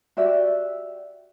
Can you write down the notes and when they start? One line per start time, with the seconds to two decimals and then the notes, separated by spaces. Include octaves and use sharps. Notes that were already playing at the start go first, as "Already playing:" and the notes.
0.17 F#4 G4 D5 E5